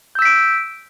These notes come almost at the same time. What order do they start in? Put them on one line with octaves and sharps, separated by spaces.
G6 E6 B6 D7